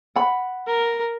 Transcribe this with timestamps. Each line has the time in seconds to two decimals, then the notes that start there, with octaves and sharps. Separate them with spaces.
0.15 F#5 B5
0.67 A#4